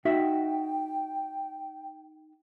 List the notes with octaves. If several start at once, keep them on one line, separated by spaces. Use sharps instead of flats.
D#4 F#4 E5 G5